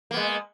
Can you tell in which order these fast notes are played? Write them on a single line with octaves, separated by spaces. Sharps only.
A#3 B3 G#3